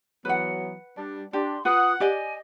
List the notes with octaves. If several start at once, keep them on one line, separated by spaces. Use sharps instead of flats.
E3 F#3 B3 B4 F#5
G3 D4
D4 G4 C6
F4 B4 F#5 D#6
G4 D5 D#5 G#5